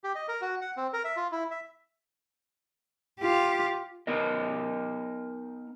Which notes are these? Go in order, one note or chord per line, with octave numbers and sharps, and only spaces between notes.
G4
D#5
A#4
F#4
F#5
C4
A#4
E5
F4
E4
E5
F4 G4
B3 D#4 A#4 D#5